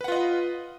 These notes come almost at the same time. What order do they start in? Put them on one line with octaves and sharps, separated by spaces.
B4 F#5 F4 D#5